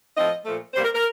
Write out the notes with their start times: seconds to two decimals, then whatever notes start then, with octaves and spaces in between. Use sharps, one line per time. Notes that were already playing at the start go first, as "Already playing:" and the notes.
0.16 A2 F3 A3 C4 D#5
0.45 A#2 F3 A3
0.74 C3 G3 A#3 C5
0.83 A#4
0.94 A#4